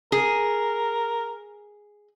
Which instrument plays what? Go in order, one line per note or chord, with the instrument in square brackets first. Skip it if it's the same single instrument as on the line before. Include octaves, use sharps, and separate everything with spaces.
[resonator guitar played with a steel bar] G#4 [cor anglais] A#4